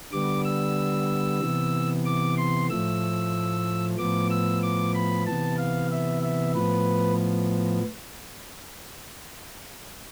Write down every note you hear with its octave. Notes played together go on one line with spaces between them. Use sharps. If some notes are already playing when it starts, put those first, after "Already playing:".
D3 G3 B3 D6
E6
C3 E3 B3
D6
C6
A2 F3 A3 E6
A2 F3 B3 D6
E6
D6
B5
C3 E3 B3 A5
F5
E5
E5
A2 F3 B3 B4